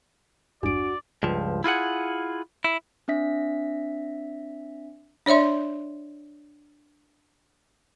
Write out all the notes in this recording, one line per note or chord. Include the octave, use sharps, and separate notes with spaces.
G#1 E2 G2 D4 F#4 D5 D7
C#2 G2 F3
E4 F4 G#4 F#5
E4
C4 D4 E5 B6
D4 C#5 D5 E5 C6